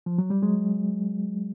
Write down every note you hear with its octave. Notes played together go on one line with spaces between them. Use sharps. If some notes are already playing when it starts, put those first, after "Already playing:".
F3
F#3
G3
F#3 G#3